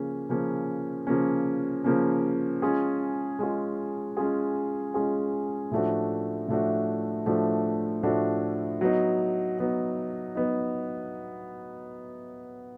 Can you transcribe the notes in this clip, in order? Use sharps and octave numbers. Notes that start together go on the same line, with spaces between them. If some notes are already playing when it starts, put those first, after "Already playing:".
Already playing: C#3 F3 A#3 C#4
C#3 F3 A#3 C#4
C#3 F3 A#3 C#4
C#3 F3 A#3 C#4
G#3 C#4 F4 G#4
G#3 C#4 F4 G#4
G#3 C#4 F4 G#4
G#3 C#4 F4 G#4
A2 F3 A3 D4 F#4
A2 F3 A3 D4 F#4
A2 F3 A3 D4 F#4
A2 F3 A3 D4 F#4
F#3 B3 D#4
F#3 B3 D#4
F#3 B3 D#4